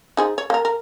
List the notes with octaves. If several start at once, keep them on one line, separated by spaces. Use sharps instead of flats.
D#4 G#4 C5
C#5
A#3 A#4
A#4